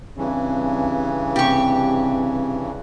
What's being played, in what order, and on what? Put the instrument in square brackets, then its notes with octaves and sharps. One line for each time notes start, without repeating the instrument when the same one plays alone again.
[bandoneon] G2 C#3 E3 [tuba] C4
[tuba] C3 [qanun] G4 C#6